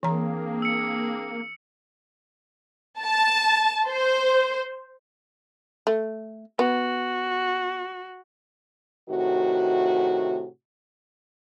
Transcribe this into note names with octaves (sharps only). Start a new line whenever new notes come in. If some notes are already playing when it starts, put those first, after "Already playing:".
E3 A#3 C4 D4 G#4 A#5
E6 C#7
A5
C5
A3
B3 F#4
A2 C3 D#3 F#4